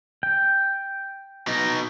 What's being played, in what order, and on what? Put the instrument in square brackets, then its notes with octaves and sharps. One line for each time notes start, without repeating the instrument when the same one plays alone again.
[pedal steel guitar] G5
[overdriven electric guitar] B2 D#4